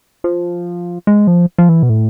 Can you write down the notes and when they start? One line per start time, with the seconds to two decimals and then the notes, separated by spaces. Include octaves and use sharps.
0.24 F3
1.07 G#3
1.27 F3
1.58 F3
1.69 E3
1.83 B2
1.90 A2